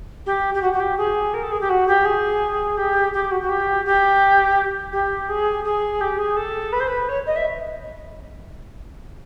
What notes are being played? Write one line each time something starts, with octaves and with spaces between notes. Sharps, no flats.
G4
G4
F#4
F#4
G4
G#4
A#4
A4
G#4
G4
F#4
G4
G#4
G4
G4
F#4
F#4
G4
G4
G4
G#4
G#4
G4
G#4
A4
B4
C5
B4
C#5
D#5
E5